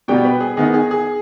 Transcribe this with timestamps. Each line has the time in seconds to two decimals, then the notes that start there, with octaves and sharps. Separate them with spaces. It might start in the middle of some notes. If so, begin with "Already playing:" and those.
0.08 B2 G3 B3 G5
0.25 B4
0.40 G#4
0.57 D#3 B3 D#4 G#4
0.74 G#4
0.91 G#4